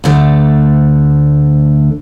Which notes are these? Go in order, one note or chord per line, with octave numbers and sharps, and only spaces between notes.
D2 D3 A3